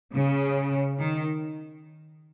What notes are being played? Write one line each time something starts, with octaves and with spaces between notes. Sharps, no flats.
C#3
D#3